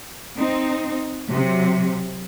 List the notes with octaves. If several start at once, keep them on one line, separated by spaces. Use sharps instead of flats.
C4 D#4
C3 F#3